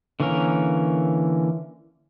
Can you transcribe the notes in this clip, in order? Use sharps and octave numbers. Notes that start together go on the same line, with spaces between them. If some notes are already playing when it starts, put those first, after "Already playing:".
D3 E3 A#3 C#4 A#4